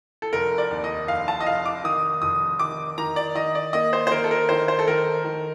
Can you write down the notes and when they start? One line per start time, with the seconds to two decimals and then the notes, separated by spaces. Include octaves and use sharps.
0.22 A4
0.33 F1 A#4
0.58 D5
0.71 D#2
0.84 D#5
1.08 F1 F5
1.28 A5
1.40 D#5
1.46 F1 F5
1.66 D6
1.84 D#3 D#6
2.22 F1 D#6
2.59 D#3 D6
2.98 D#3 A#5
3.16 D5
3.35 D#3 D#5
3.55 D5
3.73 A#3 D#5
3.93 C5
4.07 C5
4.12 D#3 A#4
4.24 A4
4.31 A#4
4.49 D#3 C5
4.68 C5
4.79 A4
4.87 D#3 A#4
5.25 D#3